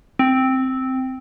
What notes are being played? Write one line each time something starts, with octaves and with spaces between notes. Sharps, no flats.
C4